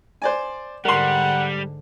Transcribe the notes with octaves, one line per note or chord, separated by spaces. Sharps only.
C5 D5 G#5
G#2 D3 G3 A#4 F#5 C6